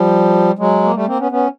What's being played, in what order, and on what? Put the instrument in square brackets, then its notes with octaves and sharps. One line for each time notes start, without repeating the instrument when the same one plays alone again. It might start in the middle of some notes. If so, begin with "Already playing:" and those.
Already playing: [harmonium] F3 G3
F#3 G#3
A#3
G3 A3
A#3 C4
B3 C#4
B3 C#4